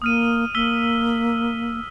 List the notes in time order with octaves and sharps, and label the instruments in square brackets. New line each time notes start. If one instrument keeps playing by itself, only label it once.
[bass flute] A#3 [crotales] D#6 F6 D#7
[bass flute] A#3 [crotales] E6 B6 G7